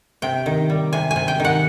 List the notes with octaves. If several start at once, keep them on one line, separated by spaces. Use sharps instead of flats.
C3 G5
D#3
G3
C3 G#5
G#5
C3
G5
D#3 F#5